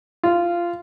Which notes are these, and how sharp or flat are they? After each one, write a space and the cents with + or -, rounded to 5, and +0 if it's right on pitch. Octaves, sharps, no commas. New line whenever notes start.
F4 -15